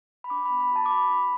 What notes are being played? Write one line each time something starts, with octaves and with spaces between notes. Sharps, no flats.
B5
D4 D6
B5
B3
B5
F#4 A5
D6
F#4 B5
D4 B5